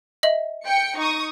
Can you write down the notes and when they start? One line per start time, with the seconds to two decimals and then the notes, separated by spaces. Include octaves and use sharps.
0.23 D#5 E5 F#7
0.66 G5 C#7
0.98 D#4 C#6 D#6